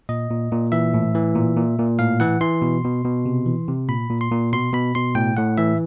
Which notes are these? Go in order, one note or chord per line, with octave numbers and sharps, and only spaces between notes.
A#2 D#5
A#2
A#2
E3 E5
A2
E3
A#2
A#2
A#2
A2 F5
E3 F#5
E3 C6
B2
B2
B2
C3
E3
C3
A#2 B5
A#2
C6
A#2
B2 C6
B2 B5
B2 C6
A2 G5
A2 F#5
E3 E5